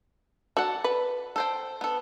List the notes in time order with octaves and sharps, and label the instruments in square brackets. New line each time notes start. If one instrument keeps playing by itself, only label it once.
[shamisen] F#4 [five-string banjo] A4 D5 F#5
[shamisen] B4
[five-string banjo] A4 C5 G5
B3 A4